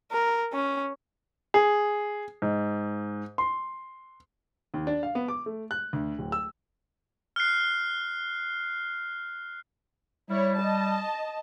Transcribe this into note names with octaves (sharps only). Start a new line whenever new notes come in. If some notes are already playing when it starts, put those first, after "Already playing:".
A#4
C#4
G#4
G#2
C6
D#2
D4
F5
B3
D6
A3
F#6
D2
D1
E6
F6 F#6 C7
G3 E4 C#5
D#5 A5